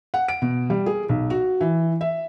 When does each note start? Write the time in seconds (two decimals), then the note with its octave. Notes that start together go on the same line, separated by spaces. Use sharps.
0.14 F#5
0.28 D7
0.42 B2
0.70 G3
0.86 G#4
1.09 B1
1.30 F#4
1.61 E3
2.01 E5